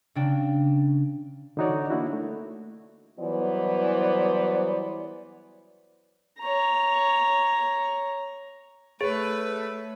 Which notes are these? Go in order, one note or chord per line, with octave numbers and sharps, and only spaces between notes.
C#3 F#3 D4 G5 E7
D3 E3 D#4 F#4 C#5 D5
A#3 D4 E4 F#4
A3
E3 F#3 G3 B3 C5 D5
C#5 A#5
A3 G#4 B4 C#5